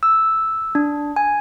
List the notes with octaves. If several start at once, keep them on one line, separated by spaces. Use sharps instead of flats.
E6
D4
G#5